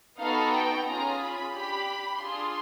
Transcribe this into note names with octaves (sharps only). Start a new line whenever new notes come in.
B3 D#4 F#4 A4 F5
G5
C#4 F4 G#4 A#5
B5
D4 G4 B5
D4 F4 G#4 C6